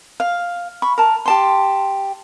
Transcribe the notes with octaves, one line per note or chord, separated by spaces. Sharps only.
F5
B5 C#6
A#4 A5
G4 A5 C6